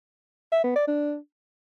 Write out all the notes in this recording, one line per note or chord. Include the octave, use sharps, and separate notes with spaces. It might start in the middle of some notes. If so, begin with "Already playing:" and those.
E5
B3
D5
D4